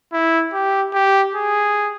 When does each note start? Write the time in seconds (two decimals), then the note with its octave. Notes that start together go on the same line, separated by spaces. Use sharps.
0.13 E4
0.53 G4
0.94 G4
1.35 G#4